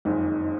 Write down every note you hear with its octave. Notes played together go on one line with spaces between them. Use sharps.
F#1 F2 D#3 G#3 D#4